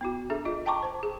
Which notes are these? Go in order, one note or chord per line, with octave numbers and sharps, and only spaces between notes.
B3 E4 F#4
D4 G#4 A4 E5
F4 D#5
D#5 G5 A5 A#5 C#6 D6
C5 A5
G#4